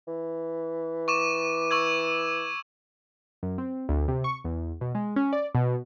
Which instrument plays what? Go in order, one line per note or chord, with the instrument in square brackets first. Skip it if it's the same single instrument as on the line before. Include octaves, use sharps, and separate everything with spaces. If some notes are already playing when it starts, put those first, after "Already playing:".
[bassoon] E3
[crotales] C#6 D6 E7
C#6 E6 G#6
[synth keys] F#2
C4
D2
C3
C#6
E2
B2
G#3
C#4
D5
B2